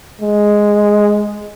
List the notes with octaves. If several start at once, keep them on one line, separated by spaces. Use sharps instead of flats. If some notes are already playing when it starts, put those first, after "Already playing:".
G#3